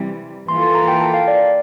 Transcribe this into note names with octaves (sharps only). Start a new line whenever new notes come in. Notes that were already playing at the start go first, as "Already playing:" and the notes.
Already playing: C3 E3 G3
E3 A#3 F4 A4 C6
C6
A#5
G5
A5
F5
D5